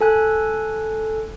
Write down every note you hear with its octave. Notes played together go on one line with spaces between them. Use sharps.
A4 G#5 F#6